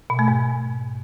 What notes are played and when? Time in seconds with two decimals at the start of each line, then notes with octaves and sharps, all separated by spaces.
0.10 B2
0.19 A3
0.28 G#2